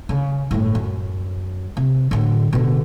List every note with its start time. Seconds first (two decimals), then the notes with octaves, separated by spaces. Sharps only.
0.09 C#3
0.51 G1 A2
0.75 F#2
1.77 C3
2.11 A2 D3
2.53 B2 D3